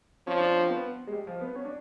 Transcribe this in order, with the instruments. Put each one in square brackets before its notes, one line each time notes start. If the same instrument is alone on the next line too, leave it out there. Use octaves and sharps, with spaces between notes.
[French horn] F3 [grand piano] C#4
[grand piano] D4
C#4
C4
B3
G#3
G3
F3
B3
C#4
D4